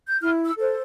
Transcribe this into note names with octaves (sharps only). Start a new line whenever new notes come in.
G6
E4 F6
E6
A4 C5